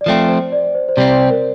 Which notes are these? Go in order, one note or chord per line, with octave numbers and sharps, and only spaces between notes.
D5
F3 A3 C4 C5
C5
D5
C5
C5
C3 G3 C4 D5
C5
C5
A#4